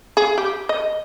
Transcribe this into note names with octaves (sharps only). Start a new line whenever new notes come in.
G#4
G4
D#5